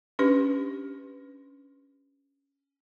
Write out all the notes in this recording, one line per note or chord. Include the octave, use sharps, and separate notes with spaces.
C#4 D4 G4 B4